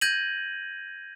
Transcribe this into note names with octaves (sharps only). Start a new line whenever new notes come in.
G6 G#6 A#6 D#7 F#7